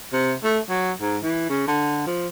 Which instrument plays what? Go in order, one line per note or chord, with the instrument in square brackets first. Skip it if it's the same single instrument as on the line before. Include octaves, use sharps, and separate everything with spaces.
[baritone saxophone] C3
A3
F#3
G#2
E3
C#3
D3
F3